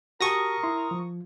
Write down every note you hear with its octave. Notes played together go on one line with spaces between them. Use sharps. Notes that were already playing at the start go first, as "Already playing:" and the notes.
F#4 G4 A#4 A5 C#6 D#6 A#6
E4 C6
F3